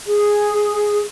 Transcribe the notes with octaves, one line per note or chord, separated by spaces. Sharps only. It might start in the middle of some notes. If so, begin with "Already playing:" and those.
G#4